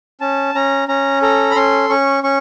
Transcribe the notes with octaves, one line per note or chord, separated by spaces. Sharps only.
C#4 A5
C#4 A#5
C#4 A#5
A4 A#5
B5
C#4 C6
C#4 C#6
C#4 C#6